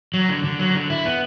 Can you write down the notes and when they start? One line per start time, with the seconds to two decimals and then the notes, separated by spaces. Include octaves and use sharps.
0.14 F#3
0.29 D3
0.44 D3
0.59 F#3
0.75 D3
0.90 E4
1.05 B3